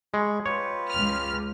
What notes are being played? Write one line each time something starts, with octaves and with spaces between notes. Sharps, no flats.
G#3 B5 C#6
F4 G4 B4 C#5
C#2 F6